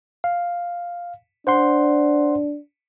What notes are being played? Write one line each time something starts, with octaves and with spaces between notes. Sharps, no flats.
F5
D4 C5 F#5 C6